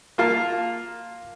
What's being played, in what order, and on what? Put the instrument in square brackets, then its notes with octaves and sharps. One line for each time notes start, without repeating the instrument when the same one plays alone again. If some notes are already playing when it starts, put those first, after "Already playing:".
[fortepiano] A#3 F4 F5 A5